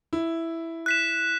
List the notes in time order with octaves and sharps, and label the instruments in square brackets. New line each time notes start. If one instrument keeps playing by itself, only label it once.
[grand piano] E4
[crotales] F#6 B6 E7